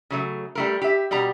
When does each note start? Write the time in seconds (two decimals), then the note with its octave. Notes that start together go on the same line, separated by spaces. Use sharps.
0.10 C#3 F#3 A3
0.55 G3 A3 A#4
0.82 G4 E5
1.11 B2 G3 G4 A#5